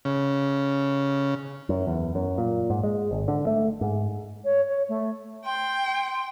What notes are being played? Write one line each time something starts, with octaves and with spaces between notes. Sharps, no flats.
C#3
F#2
E2
F#2
A#2
G#2
G#3
G#1
D3
A3
G#2
C#5
C#5
A3
G5 C6